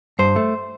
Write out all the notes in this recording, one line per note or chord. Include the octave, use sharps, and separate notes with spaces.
G2 C5
A3